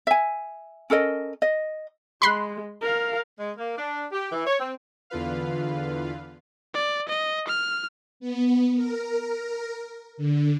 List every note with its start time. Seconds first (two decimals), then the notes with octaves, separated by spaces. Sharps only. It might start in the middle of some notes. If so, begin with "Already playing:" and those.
0.07 E5 G#5
0.90 C#4 A4 A#4 D#5
1.42 D#5
2.22 G#3 B5 C6 F#6
2.82 A#4 F5
3.39 G#3
3.57 A#3
3.76 D4
4.11 G4
4.32 E3
4.46 C#5
4.59 C4
5.10 E2 D3 F4 B4 F5
6.74 D5
7.08 D#5
7.48 F6
8.20 B3
8.75 A#4
10.17 D3